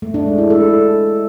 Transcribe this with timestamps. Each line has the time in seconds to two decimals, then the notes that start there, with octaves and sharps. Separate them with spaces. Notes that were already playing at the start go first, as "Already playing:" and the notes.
0.02 A3
0.14 D4
0.26 G#3
0.38 E4
0.50 A4